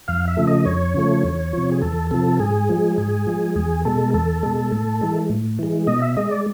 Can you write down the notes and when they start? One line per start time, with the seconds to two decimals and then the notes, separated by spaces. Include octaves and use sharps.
0.08 F2 F5
0.28 E5
0.37 C#3 F3 A3
0.47 D#5
0.65 F2 C#5
0.95 C#3 F3 A3
1.24 E2
1.53 C3 F3
1.72 G#4
1.82 E2 A4
2.11 C3 F3 A4
2.39 G#2 G#4
2.69 F3 G#3
2.98 G#2 G#4
3.27 F3 G#3
3.56 E2 G#4
3.85 B2 G#3 A4
4.14 E2 A4
4.43 B2 G#3
4.72 A2
5.01 E3 G#3
5.29 A2
5.59 E3 G#3
5.87 B2 D#5
6.02 E5
6.17 G#3 D#5
6.31 D5